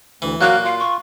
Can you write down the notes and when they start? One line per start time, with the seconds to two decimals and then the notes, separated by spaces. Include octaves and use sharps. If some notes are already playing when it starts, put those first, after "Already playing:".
0.22 D2 E3
0.41 A#2 F#3 A#3 F#4 F5 F#6
0.64 F4 F5
0.79 C#6